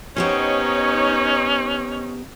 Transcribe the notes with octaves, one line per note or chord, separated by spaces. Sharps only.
B3 C#4 D#4 G4 C5 C#5